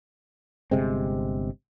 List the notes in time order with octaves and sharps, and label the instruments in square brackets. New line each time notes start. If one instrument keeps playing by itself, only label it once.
[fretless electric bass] G1 C3 G#3 C4